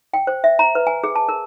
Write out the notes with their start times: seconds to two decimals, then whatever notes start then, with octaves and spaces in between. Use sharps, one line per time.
0.14 G5
0.27 C5
0.44 E5
0.59 A#5
0.75 B4
0.87 G#5
1.04 G#4
1.16 A5
1.29 A#4